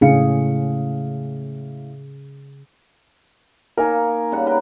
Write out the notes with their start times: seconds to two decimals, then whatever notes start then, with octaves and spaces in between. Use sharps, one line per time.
0.01 A2 C#3 C#4 G#4 F5 C#7
3.77 A#3 D#4 A#4 G#5
4.32 C#3 G3 F#5
4.46 A#4 B4 G5